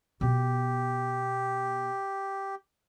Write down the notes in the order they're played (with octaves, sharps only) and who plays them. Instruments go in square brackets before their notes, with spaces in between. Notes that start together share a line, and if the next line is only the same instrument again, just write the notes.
[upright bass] B2 B3 [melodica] G4